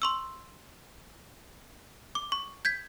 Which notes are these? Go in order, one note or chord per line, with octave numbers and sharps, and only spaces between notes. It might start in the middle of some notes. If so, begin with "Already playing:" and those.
C6 C#6 E6
D6
C#6
G6 G#6 B6